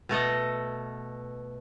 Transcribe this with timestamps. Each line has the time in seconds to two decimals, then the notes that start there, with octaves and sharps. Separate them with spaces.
0.09 B2 A3 A4 D#5